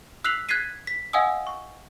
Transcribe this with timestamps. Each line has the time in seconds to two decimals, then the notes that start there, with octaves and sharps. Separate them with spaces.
0.24 E6 F#6 B6 C7 F7 F#7
0.49 F#6 G#6 A6 B6 C7 D#7
0.87 B6
1.13 D#5 F5 F#5 G#5 D#6 E6
1.47 C#6